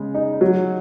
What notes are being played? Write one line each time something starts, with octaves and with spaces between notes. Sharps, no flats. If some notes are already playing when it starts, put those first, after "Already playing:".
Already playing: C#3 G#3
D#4
F#3